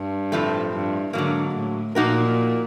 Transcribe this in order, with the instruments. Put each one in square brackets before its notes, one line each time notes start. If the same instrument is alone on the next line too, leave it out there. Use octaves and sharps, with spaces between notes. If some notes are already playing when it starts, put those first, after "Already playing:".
Already playing: [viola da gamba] G2
[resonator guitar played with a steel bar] A2 F3 A3 C4
[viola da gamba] G2
[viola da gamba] G#2 [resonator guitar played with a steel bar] D3 F#3 A#3
[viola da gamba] A2
[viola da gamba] A#2 [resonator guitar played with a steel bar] F3 A#3 D#4 F#4 A#4